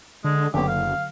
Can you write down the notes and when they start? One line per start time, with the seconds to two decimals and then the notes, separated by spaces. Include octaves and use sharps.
0.24 D3 G#3
0.54 F#1 D3 F#3 B3 G4
0.68 F5